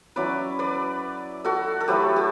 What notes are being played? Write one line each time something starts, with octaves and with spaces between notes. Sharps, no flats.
F#3 C#4 E4 B4 D5
B4 D5
F#4 A4
A4
F#3 A3 E4 G4 B4
G4